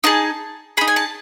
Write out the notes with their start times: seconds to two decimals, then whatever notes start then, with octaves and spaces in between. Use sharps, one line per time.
0.04 D#4 G#4 A5
0.77 D#4 G#4 B5
0.88 G#5
0.96 A5